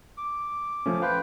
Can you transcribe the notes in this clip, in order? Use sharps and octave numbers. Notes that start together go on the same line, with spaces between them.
D6
F3 A3 C#4
B4 C5 F5 G5